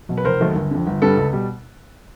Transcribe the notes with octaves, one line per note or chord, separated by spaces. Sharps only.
B2 F#3
B4
F1 A#4 C5
D#2 D#3 F#3 A3
G1
F2 D3
G1
G2 D3 G3 A4 B4
C#2
B2 G3